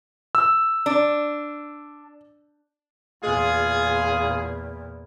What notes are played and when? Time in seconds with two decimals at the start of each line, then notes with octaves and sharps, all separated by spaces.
0.35 E6
0.86 D4
3.23 E2 A#2 F4 G#4